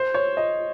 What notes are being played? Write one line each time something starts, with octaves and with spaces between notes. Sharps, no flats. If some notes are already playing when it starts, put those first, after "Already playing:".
Already playing: C5
C#5
D#5